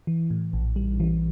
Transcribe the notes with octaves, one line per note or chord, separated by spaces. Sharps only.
E3
A2
A#1
G3
E3